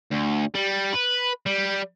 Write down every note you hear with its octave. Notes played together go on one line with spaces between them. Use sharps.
D2
G3
B4
G3